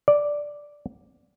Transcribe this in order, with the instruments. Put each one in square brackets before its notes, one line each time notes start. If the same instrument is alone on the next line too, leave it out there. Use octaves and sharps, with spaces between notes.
[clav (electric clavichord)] D5